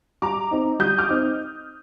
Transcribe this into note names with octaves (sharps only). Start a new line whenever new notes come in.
G3 A#5 D6
C4 D#4
G3 D#6 G6
D6 F6
C4 D#4